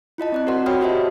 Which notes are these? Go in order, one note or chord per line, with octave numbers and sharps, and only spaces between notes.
E4 F4 D#5 A5
C4 D5 F#6
F#4 A#4 C5 D5 F#5 C6
F#4 C#5 G5 B5 D#6 F6
F4 G4 C5 D#5 E5 A5